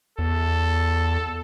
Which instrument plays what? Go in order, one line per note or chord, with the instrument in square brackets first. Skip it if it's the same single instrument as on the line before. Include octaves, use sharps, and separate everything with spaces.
[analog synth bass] E2 [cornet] A4